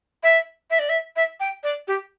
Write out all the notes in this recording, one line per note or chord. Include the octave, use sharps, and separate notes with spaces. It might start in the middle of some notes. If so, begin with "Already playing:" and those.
E5
E5
D5
E5
E5
G5
D5
G4